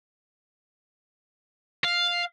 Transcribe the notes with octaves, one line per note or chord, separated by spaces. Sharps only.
F5